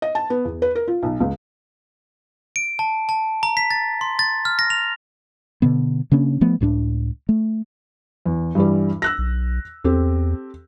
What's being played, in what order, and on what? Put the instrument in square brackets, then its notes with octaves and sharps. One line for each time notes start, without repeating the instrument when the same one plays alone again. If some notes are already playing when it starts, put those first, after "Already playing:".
[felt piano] D#5
A5
B3
E2
B4
A#4
F4
B1
C#2
[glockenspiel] D7
A5
A5
A#5
B6
A6
C6
A6
F6
A#6
F7
[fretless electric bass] B2 D3 B3
C#3 A#3 C#4 D4
F3 A3 B3
C#2 A2 C#4 D4
A3
[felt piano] E2
G2 E3 G3
E6 F#6 A#6
[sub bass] B1
[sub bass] E2 [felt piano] C4 G4 A4